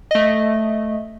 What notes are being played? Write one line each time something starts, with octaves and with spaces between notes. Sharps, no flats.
A3 D#5